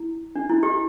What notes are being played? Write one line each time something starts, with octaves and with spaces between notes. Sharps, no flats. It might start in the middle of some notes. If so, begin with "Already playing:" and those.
Already playing: E4
D4
E4
G4